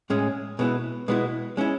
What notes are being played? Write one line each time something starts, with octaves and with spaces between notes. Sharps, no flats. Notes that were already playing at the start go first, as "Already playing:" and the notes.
A2 G#3 C#4 G#4
B2 G#3 B3 E4
B2 G#3 B3 E4
G#3 C#4 E4